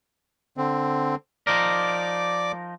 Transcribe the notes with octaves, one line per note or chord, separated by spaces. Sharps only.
D3 C4
F3 D#4 A#4 D5 D6